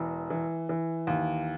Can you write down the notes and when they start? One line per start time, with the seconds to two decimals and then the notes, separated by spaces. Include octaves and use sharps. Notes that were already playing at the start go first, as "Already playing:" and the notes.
Already playing: E1 E3
0.30 E3
0.69 E3
1.07 D#2